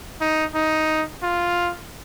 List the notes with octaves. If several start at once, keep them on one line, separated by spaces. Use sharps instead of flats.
D#4
D#4
F4